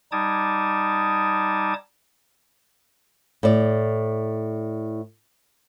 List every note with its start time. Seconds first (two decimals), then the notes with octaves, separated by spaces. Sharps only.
0.12 G3 D#4 A5 D6 D#6 G#6
3.43 A2 D5